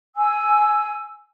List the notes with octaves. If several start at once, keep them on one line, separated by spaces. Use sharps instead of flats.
G#5 E6